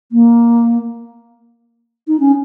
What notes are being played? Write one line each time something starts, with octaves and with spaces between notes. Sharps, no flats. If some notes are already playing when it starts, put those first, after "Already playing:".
A#3
D#4
C#4